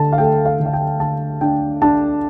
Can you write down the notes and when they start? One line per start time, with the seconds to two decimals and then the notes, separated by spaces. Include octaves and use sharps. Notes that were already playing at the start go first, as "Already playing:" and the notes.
Already playing: D3 A5
0.13 F5
0.18 A3 G5
0.45 F5
0.59 D3
0.66 F5
0.73 G5
1.00 D3 A5
1.41 D4 G5
1.82 D4 A5